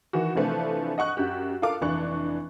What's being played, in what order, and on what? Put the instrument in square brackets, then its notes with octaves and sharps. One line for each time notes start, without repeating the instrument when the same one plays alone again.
[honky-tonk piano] D#3 E3 F#4
C3 E3 F3 A3 D4 B4
D#5 F#5 C#6 F#6
F#2 F#4 G4
F4 A4 A#4 F5 D6
F1 E3 D4 C#6 F#6